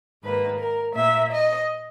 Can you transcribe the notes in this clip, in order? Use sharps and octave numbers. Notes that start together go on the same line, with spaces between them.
G#2 D#3 A#3 B4
A#4
A#2 A#3 E5
D#5